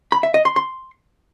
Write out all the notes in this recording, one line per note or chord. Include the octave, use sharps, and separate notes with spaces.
B5
E5
D#5
C6
C6